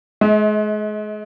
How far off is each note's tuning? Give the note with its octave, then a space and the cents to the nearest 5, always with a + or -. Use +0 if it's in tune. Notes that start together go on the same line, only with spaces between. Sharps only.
G#3 +35 E5 -45